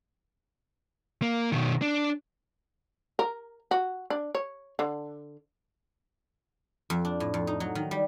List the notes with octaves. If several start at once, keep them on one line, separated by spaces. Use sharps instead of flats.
A#3
B2 D#3
D4
A#4
F#4
D4
C#5
D3
F2
D4
A2
F2
D#4
F#3
D#3
G3